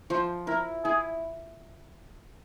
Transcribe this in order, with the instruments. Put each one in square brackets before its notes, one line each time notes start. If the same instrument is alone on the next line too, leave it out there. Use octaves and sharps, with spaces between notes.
[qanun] F3 [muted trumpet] C5
[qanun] E4 [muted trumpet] A#4
[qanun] E4 [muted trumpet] G#4